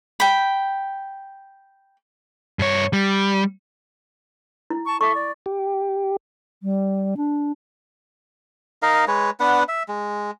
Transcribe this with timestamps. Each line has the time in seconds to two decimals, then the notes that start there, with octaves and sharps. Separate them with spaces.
0.20 G5 B5
2.59 G2 C#5
2.93 G3
4.70 E4
4.85 A5 C#6
5.01 A4 E5 C#6 D6
5.14 D5
5.46 G4
6.63 G3
7.17 D4
8.83 D#4 A#4 D#5 F5
9.08 G#3 B4 C#5
9.40 B3 D4 B4 F#5
9.69 E5
9.88 G#3